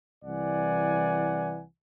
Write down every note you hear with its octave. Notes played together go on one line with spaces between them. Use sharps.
C2 E3 D5 F#5 G#5